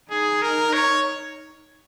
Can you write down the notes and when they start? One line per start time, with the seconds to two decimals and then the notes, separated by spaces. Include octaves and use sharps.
0.11 D#4 G#4
0.42 A#4
0.73 C#5